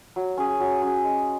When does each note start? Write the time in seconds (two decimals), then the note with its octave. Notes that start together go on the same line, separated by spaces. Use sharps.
0.16 F#3
0.37 C#4 G#4
0.60 F#3
0.82 C#4 G#4
1.04 G#3